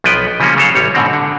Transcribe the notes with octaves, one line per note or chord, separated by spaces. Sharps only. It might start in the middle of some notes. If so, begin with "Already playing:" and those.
B1 F3 B3 B4 G5
C#3 F3 G3 A#3 C#4
C#3 F#3 A4 F5
A1 G3 C#5
G#2 B2 D3 C4
D3